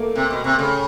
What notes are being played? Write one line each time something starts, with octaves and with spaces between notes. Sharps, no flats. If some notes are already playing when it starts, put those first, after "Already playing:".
Already playing: A3 A#3
C3
B2
C3
C#3 A3